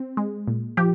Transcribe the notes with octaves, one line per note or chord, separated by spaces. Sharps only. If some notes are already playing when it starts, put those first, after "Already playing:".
Already playing: C4
G#3
A#2
F3 G4